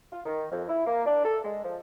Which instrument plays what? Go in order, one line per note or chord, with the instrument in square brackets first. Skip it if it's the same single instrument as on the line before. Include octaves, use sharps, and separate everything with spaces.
[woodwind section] F4
D#3
F2
E4
A#3
D4
A4
G#3
F3